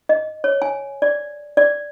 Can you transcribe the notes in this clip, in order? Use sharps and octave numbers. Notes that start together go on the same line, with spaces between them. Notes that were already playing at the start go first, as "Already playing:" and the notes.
D#5
C#5
G#5
D5
D5